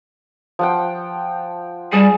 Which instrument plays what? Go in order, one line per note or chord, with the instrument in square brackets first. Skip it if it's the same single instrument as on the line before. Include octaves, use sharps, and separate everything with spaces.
[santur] F3 F#5 G5
[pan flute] G3 [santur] G#4 A5